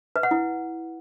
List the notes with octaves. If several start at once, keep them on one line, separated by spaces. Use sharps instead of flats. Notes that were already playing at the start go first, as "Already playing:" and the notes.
B4
F#5
E4